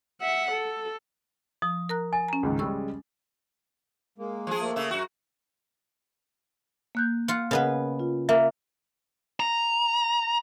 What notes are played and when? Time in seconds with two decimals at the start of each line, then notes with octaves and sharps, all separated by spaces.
0.22 E5 F#5
0.51 A4
1.62 F3 D#6
1.89 A#4 A#5 F#6
2.13 G#5 A6
2.28 C#4 A#5
2.43 C#2 G#2 D#3
2.59 C#3 G3 G#3 C#6 E6
4.18 G#3 A#3
4.47 F3 G#4
4.60 A3 A#3 A4
4.76 C#3 E5
4.91 F#2 F#4
6.95 A#3 F#6 G6
7.28 F4 F#5
7.51 C#3 B3 A#4 B4 D#5 F#5
7.99 F4
8.29 A#3 E5
9.40 A#5